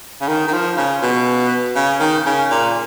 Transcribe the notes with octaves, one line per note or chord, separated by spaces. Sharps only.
C#3
D#3
D#3
F3
C#3
B2
C#3
D#3
C#3
A#2